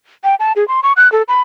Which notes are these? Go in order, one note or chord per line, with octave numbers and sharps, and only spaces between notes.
G5
A5
G#4
C6
C#6
F#6
A4
B5